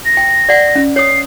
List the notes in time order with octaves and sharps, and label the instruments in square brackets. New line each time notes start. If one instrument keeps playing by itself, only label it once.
[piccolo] A#6
[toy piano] G5
D5 F#5
C#4
[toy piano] C#5 D#6 [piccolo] C7